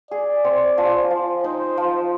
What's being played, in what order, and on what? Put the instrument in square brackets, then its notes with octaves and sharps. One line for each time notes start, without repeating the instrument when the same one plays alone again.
[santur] G#4 [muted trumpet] D5
[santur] C4
F3
F3
[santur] D#4 [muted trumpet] C5
[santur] F3